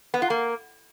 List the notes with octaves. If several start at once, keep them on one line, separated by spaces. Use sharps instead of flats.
B3
F4
A#3